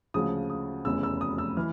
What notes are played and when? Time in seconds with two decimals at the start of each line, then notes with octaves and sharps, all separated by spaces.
0.14 D2 C#3 F3 G#3 D#6
0.50 D#6
0.85 F1 E2 C#3 E6
1.03 E6
1.21 D#6
1.38 E6
1.57 E3 F6